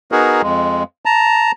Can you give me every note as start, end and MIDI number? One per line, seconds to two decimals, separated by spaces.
0.12 0.42 59
0.12 0.42 63
0.12 0.42 66
0.12 0.42 68
0.12 0.42 70
0.43 0.83 41
0.43 0.83 56
1.05 1.52 81
1.05 1.52 82